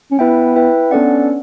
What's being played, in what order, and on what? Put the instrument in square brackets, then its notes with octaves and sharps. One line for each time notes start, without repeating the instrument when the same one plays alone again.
[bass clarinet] C#4
[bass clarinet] B3 [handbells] E4 B4 E5 G5
[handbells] E4 B4 E5 G5
[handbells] B3 D4 A4 D5 F#5 [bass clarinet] C#4